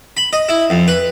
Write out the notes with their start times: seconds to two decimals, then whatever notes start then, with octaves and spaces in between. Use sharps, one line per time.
0.17 B5
0.33 D#5
0.49 E4
0.70 F2
0.88 B4